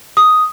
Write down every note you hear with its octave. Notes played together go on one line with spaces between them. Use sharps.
D#6